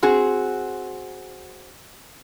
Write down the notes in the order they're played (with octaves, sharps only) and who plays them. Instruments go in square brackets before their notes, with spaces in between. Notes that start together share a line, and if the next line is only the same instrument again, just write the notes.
[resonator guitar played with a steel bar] C4 F#4 G#4